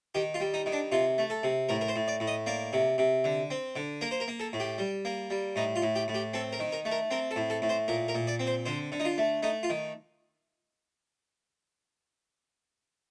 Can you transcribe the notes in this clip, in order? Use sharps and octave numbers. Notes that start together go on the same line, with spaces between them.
D#3 G4
F4
G3
D#4
D#3
D4
C3 F4
A3
A4
C3
A2 A#4
A#4
C5
A2
D5
A2
D#5
A#3 D5
C3
C3
D3
C4
D3
A#3 A#4
C5
A#4
A#3
A4
A2
G4
G3
A#3
G3
A2 D#4
F4
A2
G4
A2
G4
C4 A4
A#4
D#3
A#4
A3
A#4
C4 A#4
A4
A2
A4
A2
C5
A#2 A#4
A#4
A#2
D5
C4
C5
D3 C5
D3
D#4
F4
A3
A3 D#4
F4
D#3